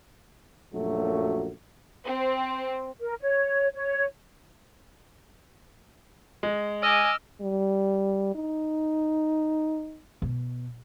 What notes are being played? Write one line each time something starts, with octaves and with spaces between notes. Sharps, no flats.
A#1 F#2 F#3 A3
C4
A#4
C#5
C#5
G#3
D#5 G#5 D6 E6 F6
G3
D#4
B2